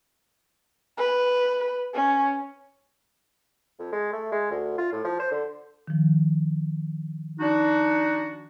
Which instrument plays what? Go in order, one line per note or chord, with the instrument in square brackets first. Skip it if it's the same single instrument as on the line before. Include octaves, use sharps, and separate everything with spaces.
[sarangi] B4
C#4
[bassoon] F2
G#3
A3
G#3
D2
F4
A2
F3
C5
D3
[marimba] D#3 F3
[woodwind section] D4 D#4 F#4